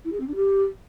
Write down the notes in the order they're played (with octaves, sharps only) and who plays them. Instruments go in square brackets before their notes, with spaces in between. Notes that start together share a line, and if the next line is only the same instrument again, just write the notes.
[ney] E4
G#4
C4
D4
G4